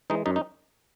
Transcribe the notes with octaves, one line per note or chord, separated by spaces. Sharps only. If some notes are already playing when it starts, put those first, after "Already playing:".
E3 G#3 D#4
F#2 D#4
D#4